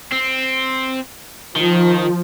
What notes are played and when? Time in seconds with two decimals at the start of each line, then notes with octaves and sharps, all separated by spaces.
0.12 C4
1.56 D#3 F3